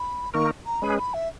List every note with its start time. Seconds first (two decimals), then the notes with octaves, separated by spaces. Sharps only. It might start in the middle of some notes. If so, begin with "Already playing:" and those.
Already playing: B5
0.34 D#3 A#3 D#4 A#4 C#6
0.66 A#5
0.82 G#3 C#4 G#4 B4 B5
0.98 B5
1.14 E5